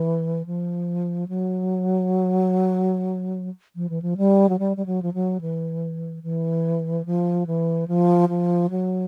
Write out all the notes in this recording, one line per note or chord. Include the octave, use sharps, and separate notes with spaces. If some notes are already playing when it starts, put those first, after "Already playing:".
Already playing: E3
F3
F#3
F3
E3
F3
G3
F#3
G3
G3
F#3
F3
F#3
E3
E3
F3
E3
F3
F3
F#3